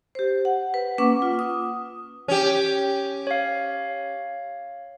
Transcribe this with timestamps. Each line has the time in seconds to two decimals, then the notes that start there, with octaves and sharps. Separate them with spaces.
0.15 G4 C5
0.45 F#5
0.74 B4
0.98 A#3 C#4 B4 F#5 C#6 D6
1.22 F4
1.39 D#6
2.28 C#4 G4
3.27 C#5 F5